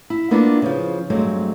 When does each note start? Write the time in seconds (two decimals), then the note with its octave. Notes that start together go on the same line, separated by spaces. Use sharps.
0.10 E4
0.31 A#3 B3 D4 E4 F4
0.62 C#3 F3
1.10 G2 F#3 G#3 A3 C4